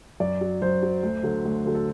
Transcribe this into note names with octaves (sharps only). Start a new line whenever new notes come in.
F#2 D5
F#3
F#2 C5
F#3
D2
D3 F#3
D2
D3 F#3
A4